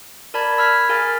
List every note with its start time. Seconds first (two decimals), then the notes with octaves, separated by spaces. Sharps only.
0.34 A#4 D5 A5 B5 G#6
0.58 B5 E6 F6 G#6 B6
0.89 G#4 A#4 F5 G#5 F6 A6